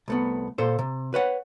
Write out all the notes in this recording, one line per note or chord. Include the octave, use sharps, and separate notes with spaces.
C2 A3 B3
A#2 A4 C5
C3
B4 C#5 F#5